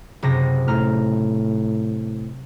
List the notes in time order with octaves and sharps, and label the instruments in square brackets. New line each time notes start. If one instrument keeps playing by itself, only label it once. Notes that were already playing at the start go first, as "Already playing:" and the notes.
[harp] F#1 C3 A#6
[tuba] A2 [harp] A#5 F6